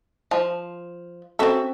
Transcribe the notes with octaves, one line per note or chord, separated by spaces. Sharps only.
F3
C4 C#4 F#4 A4 E5